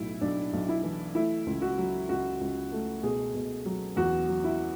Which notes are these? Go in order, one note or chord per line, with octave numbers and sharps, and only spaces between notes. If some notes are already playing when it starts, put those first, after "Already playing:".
Already playing: B1 A2 E4
B1 D4
B1
E4
E3
A3 E4
C#2
F#4
F#3
C#2 F#4
C#2
A3
B2 G#4
B2
F#3
E2 F#4
F#3
E4